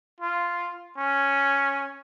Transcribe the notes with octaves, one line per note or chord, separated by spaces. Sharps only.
F4
C#4